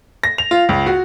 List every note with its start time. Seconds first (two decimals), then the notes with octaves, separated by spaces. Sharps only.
0.24 A#6
0.38 F7
0.51 F4
0.69 C#2
0.87 F#4